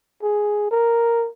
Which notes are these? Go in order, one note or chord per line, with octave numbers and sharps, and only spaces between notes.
G#4
A#4